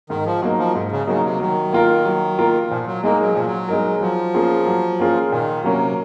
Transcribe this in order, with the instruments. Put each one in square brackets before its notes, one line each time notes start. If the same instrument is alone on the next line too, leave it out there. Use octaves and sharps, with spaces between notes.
[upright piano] G#2 [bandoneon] D#3
[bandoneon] F3
[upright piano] F#3 A#3 D#4
[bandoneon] F3
[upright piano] G#2
[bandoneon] C#3
[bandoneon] C#3 [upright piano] F#3 A#3 D#4
[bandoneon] C3
[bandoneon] D#3 [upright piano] F#3
[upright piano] A#3 F4 A#4
F#3
A#3 F4 A#4
[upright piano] A#2 [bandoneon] F3
[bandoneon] F#3
[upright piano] G#3 D#4 A#4 [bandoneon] A#3
[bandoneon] F#3
[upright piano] A#2 [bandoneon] F3
[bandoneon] F#3
[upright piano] G#3 D#4 A#4
[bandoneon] F3 [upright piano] F#3
[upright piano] A#3 C#4 F4 G#4
F#3
A#3 C#4 F4 G#4
[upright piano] A#2 [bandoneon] D#3
[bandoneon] C3 [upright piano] F#3 A#3 C#4